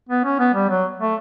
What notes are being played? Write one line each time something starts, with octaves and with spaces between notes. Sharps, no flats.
B3
C#4
B3
G3
F#3
A3